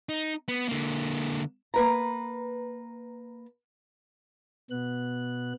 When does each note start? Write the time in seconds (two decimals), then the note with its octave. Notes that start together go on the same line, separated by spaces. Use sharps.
0.09 D#4
0.48 B3
0.69 D3 A#3
1.74 A#3 B4 A#5
4.71 B2 B3 F#6